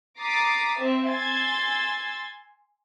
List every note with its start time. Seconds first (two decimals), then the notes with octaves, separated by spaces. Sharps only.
0.18 A#5 D6 D#6 A6 B6 C7
0.77 C4 E5
1.07 G#5 C6 E6 G#6 A6